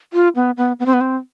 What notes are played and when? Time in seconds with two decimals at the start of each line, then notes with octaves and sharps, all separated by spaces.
0.13 F4
0.36 B3
0.57 B3
0.79 B3
0.86 C4
0.93 B3
1.01 C4